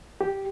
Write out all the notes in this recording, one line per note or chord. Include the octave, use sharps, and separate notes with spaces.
G4